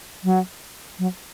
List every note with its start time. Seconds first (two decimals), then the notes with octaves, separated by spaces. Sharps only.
0.24 F#3
0.99 F#3